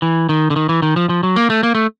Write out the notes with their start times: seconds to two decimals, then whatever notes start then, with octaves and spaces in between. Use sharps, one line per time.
0.02 E3
0.29 D#3
0.50 D3
0.56 D#3
0.69 E3
0.82 D#3
0.96 F3
1.09 F3
1.23 F#3
1.36 A#3
1.50 A3
1.63 A#3
1.75 A3